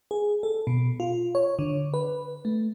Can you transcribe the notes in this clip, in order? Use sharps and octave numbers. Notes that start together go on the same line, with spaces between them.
G#4
A4
B2
F4
C#5
D3
B4
A3